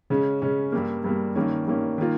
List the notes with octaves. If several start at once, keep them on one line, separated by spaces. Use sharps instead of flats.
C#3 G#3 C#4
C#3 G#3 C#4
G2 G3 A#3
G2 G3 A#3
G2 D#3 A#3 C#4
G2 D#3 A#3 C#4
D#3 A#3 F4